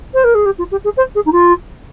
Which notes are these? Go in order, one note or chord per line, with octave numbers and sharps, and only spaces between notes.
C5
A#4
G#4
G4
F4
G4
G#4
C5
G#4
D#4
F4